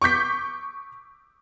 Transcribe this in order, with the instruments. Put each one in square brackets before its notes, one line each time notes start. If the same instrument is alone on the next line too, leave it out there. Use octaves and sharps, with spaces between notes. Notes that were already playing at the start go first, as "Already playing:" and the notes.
[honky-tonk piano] C#6 D6 G6 B6